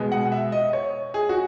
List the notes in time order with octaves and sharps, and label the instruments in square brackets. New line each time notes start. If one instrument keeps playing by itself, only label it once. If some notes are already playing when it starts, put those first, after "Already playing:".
Already playing: [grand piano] B2 G#3 B3
F#5
E5
D#5
C#5
G#4
F#4